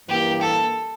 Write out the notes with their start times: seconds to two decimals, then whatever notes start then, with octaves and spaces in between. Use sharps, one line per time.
0.08 G2 E3 A#3 G4
0.41 A4